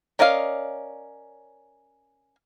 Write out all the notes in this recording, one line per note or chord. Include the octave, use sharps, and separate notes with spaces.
C#4 A#4 D5 D#5 F5